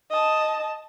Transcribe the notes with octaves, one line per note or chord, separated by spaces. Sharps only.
D#5 A5